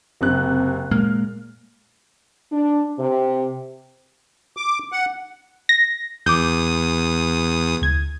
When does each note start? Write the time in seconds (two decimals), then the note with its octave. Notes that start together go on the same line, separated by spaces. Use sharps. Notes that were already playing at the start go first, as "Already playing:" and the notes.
0.21 F#1 C3 F#6
0.91 A#2 G#3 A#3 F6
2.52 D4
2.99 C3
4.57 D6
4.92 F#5
5.69 A#6
6.26 E2 D6 D#6 G6
7.82 D2 G#6